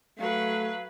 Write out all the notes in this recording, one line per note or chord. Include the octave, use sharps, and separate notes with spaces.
F#3 A3 B4 F5